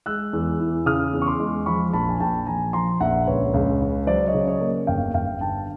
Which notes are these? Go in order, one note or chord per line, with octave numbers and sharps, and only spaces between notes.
G#3 E6 F#6
E2
E3
C#3 D#6 F6
E2
C#6
C6 D6
G#3
F3 B5 C#6
A#1 A5 B5
G#5
A#1 G5 A5
F3 G#5 A#5
F3 A#5 C6
A#1 E5 F#5
C#2 B4 C#5
C#2
C#3
F#3 C5 D5
C#5 D#5
C#3
C#5 D#5
A#3
G1 F5 G5
G1 F5 G5
D3 G5 A5